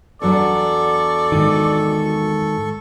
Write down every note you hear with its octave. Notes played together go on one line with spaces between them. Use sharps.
E2 F#3 D4 A4 D5 C#6
G#2 D#3